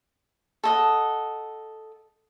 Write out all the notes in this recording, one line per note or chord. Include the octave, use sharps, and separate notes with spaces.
A4 D#5 F#5